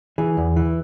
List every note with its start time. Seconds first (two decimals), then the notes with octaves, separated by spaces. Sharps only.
0.18 E3 G#4
0.37 E2
0.56 E3